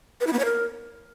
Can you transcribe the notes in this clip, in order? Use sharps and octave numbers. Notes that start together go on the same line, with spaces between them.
B4
E4
B3
C#5
A#4